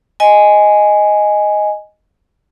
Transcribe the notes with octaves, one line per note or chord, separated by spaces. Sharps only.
D#5 G#5